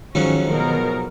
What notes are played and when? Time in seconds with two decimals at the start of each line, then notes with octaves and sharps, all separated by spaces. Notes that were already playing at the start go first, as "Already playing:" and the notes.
0.15 F2 G#2 D#3 F#3 C#4
0.50 B2 A#4